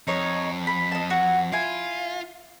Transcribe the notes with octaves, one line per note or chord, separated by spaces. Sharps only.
F2 D#4 C#5
B5
D#5 A5
F#4 F#5
E4 F4 G#5